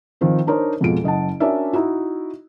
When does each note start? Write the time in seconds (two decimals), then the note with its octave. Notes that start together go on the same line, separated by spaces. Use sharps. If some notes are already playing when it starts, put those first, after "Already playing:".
0.21 D#3 F3 C4 F4
0.47 D4 D#4 A#4 C5 C#5
0.81 F2 B2 G#3 F4 D7
1.04 F#1 D#5 F#5 A5
1.40 C#4 D4 F#4 A#4 D5 E5
1.73 D#4 E4 F#4